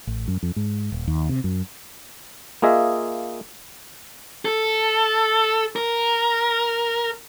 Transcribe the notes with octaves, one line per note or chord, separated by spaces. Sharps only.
A1
F#2
F2
G#2
D#1
D#2
C3
F#2
A#3 F4 G#4 D#5 E5
A4
A#4